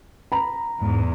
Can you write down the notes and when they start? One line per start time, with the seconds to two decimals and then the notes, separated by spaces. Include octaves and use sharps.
0.32 A#5 B5
0.81 E2 G#2